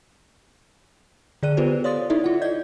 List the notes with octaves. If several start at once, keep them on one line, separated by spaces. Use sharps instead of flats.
D3 G#4 D5 F#6 D#7
B3 F4 G4 A4 B4 C5
C#5 D5 F5 C6 D#6 A6
D#4 E4 A4 D5 E5
F4 F#5
D5 D#5 G6 G#6